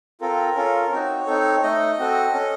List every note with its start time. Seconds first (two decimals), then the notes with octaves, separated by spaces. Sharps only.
0.21 C4 F4 A4 A#4
0.56 C#4 F4 A4
0.91 C4 D#4 F#4 C#5
1.27 C4 D#4 A4
1.63 A3 D#4 A4 D#5
1.99 C4 F#4 A4
2.33 C#4 A4